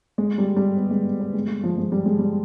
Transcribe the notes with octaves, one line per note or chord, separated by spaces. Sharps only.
G#3
G3
G3
B3
G#3
B3
G#3
G#3
F3
G#3
G3
G#3
G3